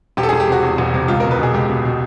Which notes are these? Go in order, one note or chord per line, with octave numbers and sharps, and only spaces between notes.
E1 G4
A4
G#4
E1
G4
C3 F#4
E2
E1
C3
C#2 F4
A#4
B2
B4
B2 G#4
C#2 G4
B2
B2